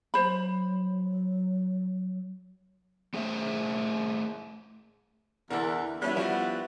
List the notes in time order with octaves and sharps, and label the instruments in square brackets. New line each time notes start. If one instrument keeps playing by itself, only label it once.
[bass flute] F#3 [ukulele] C5 B5
[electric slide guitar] A3 G#4 C5 E5
[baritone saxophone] E2 [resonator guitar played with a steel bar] D3 E3 [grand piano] A#4
[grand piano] G3 C#4 E4 [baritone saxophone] B3
[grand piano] F3 G3 F#4 [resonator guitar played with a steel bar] E4